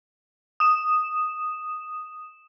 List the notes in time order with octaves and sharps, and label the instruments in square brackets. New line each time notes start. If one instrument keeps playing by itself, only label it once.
[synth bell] D#6 E7